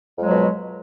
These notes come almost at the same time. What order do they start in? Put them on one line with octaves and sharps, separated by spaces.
F2 G#3 F#3 B2